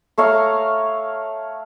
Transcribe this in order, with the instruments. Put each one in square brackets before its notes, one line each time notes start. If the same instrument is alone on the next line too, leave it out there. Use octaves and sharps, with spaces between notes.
[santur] A3 C#5 F5 A#5